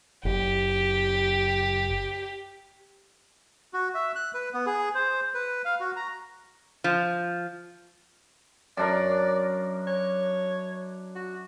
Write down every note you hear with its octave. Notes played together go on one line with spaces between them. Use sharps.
F#1 G4
F#4
E5
F#6
B4
B3
G#4
C5
B4
F5
F#4
A#5
F3
F#2 D4 A#4 D5
C#5
F#4